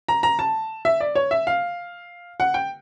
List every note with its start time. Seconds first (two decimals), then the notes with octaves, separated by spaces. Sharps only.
0.08 A#5
0.23 A#5
0.39 A5
0.85 E5
1.00 D5
1.15 C#5
1.31 E5
1.47 F5
2.40 F#5
2.54 G5